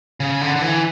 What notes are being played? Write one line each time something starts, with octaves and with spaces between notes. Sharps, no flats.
C#3
D3
D3
E3